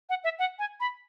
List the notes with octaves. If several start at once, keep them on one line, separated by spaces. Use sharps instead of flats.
F#5
E5
F#5
G#5
B5